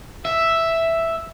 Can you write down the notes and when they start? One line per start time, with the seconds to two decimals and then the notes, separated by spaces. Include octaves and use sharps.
0.25 E5